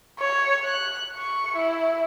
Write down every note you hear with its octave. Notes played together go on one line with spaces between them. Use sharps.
C#5
F#6
C#6
E4